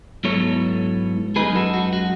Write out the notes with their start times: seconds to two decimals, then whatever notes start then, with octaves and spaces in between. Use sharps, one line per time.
0.24 G#2 F#3 B3 E4 A4 C#5
1.36 F#2 C#3 G#3 D#4 G#4 B4
1.55 F#4 A4
1.74 F#4
1.93 F#4